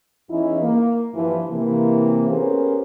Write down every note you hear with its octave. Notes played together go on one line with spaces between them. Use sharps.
E2 E3 C#4 D#4 E4
A#3
G2 E3 F3
C3 E3 A#3
B3 C#4 G4 G#4 A#4 C5